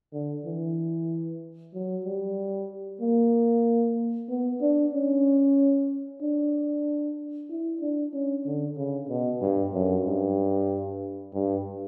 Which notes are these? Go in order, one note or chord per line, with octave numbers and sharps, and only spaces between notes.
D3
E3
F#3
G3
A#3
B3
D4
C#4
D4
E4
D4
C#4
D3
C#3
B2
G2
F#2
G2
G2